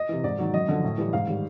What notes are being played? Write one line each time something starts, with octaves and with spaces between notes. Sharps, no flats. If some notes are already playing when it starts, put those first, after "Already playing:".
Already playing: D#5
C3 E3
G#2 D5
D#3 F#3
F#2 D#5
D3 F3
A2
E3 G3
G#2 F5
D#3 G3